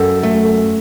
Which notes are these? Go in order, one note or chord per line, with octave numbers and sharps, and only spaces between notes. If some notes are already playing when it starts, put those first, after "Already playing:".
Already playing: F#2 A4
A3